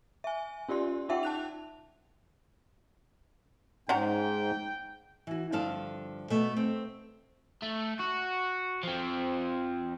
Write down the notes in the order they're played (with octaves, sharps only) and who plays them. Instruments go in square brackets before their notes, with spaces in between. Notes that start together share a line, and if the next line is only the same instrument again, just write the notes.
[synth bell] E5 G#5
C#4 F4 G4 D5 C6
D#4 F4 E5 F#5 G5
A5 F#6 F7
[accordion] G#2 [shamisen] C#4 F#5 A#5 [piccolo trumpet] G5
[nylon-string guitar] E3 F#4
G2 D3 F3 F5 A5
B2 A3
C4
[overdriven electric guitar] A3
F#4
F3 C4